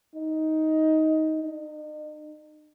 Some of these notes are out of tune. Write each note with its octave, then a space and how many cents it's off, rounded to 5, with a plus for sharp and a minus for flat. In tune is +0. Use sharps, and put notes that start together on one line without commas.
D#4 +15
D#4 -40